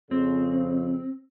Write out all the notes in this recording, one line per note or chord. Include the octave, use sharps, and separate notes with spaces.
F2 C#3 C4